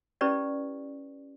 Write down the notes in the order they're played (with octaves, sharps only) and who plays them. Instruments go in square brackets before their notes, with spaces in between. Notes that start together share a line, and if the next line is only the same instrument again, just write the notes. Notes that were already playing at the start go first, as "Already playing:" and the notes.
[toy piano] C#4 E4 G4 B4 D5